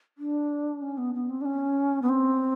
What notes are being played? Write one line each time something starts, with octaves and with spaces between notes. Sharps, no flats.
D4
C#4
B3
B3
C4
D4
C#4
B3
C4